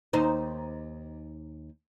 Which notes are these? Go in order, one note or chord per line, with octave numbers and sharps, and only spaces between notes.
D#2 D#4 C5